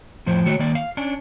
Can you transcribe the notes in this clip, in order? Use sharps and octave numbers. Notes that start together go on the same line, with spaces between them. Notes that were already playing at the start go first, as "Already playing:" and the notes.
F2 A2 F3 C5
D#3 A3 F#4 C#5
D#3 A#3 D5
F5
C#4 D4